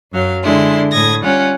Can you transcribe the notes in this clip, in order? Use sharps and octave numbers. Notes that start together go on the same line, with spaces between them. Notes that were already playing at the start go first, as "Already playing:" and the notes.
F#2 F#3 F5
D3 G#3 E4 C6
A2 D#6 G#6 A#6
G3 C#4 F4 F#5